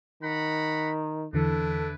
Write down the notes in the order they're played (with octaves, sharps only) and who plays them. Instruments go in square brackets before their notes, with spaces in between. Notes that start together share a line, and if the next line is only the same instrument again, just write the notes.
[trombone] D#3 [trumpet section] F#5 A#5 B5
[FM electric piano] E2 D3 E3 [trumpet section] D4 E4 B4 [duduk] A4